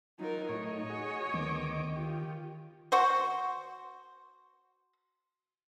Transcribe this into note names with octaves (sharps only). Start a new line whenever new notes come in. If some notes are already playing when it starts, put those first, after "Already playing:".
F#3 D#4 F4 A#4
A2 D#4 C#5 D#5
F#4 G#4
D2 D#3 B3 D6
F4 G4
F#4 C5